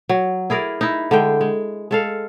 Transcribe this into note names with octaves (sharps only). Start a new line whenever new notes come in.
F#3
E4 G#4 A#4 D5
D#4 E4
D3 G#3 G5
G#3
G#3 A4 F5